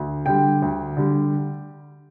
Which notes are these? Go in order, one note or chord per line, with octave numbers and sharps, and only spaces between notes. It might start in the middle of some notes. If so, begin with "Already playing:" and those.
Already playing: D2
D3 G3 G5
D2
D3 G3